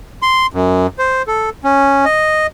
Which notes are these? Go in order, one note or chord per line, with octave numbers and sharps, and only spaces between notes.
C6
F#2
C5
A4
C#4
D#5